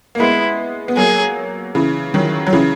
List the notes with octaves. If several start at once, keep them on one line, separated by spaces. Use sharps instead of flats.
A#3
G#3 B3 E4
B3
F#3 A#3 G#4
C#3 E3
D#3 F#3
F#3
C#3 E3